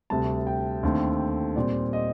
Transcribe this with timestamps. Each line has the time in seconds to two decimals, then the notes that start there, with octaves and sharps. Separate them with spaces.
0.10 D2 C3 G3 A5
0.47 G5
0.83 D#2 D3 A3 C4
1.56 A#2 G3 C4 D5
1.93 D#5